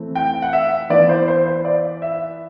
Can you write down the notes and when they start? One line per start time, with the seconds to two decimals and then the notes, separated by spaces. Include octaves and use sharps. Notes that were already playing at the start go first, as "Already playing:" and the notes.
Already playing: E3 A3 C4 E4
0.15 G5
0.42 F#5
0.53 E5
0.90 E3 B3 E4 D5
1.09 C5
1.28 C5
1.46 C5
1.65 D5
2.02 E5